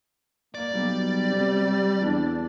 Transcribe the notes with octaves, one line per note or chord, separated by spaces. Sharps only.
A#3 D5
B1 G3
C3
E2 D4